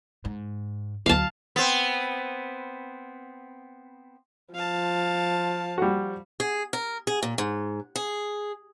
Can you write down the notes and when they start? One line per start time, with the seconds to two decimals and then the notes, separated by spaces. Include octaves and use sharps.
0.25 G#2
1.06 D2 F#3 F5 A5
1.56 B3 C4
4.54 F3 F5 A5
5.78 G3 F#4
6.40 G#4
6.73 A#4
7.07 G#4
7.23 A#2
7.38 G#2
7.96 G#4